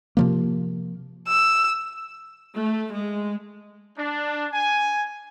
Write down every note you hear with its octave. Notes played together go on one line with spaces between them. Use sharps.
C3 F3 A#3
E6
A3
G#3
D4
G#5